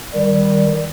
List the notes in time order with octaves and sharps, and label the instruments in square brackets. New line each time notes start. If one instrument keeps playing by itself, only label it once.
[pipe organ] D#3 G3